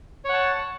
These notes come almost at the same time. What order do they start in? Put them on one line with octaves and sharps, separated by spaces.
C#5 F#5 A5